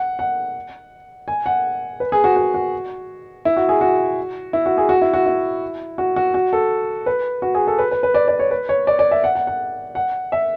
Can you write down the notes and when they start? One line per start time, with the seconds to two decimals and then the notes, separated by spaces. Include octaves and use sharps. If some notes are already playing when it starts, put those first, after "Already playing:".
Already playing: F#5
0.19 F#5
1.28 G#5
1.46 F#5
2.00 B4
2.12 G#4
2.24 F#4
2.36 F#4
2.54 F#4
3.45 E4
3.57 F#4
3.69 G#4
3.81 F#4
4.53 E4
4.66 F#4
4.78 G#4
4.89 F#4
5.01 E4
5.14 F#4
5.26 E4
5.98 F#4
6.16 F#4
6.34 F#4
6.53 A4
7.06 B4
7.42 F#4
7.55 G#4
7.67 A4
7.79 B4
7.91 B4
8.03 B4
8.14 D5
8.28 D5
8.39 C#5
8.51 B4
8.69 C#5
8.87 D5
8.99 D5
9.11 E5
9.24 F#5
9.35 F#5
9.47 F#5
9.95 F#5
10.32 E5